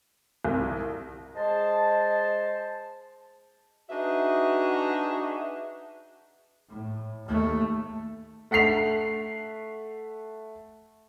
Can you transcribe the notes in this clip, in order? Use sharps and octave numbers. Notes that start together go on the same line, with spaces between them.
C2
G#3 C5 A5
D4 D#4 F#4 G#4 B4 E5
A2
D#2 A3
A3 F#5 B6 C7 F7